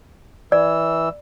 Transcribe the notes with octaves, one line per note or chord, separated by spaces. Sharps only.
E3 D5 E6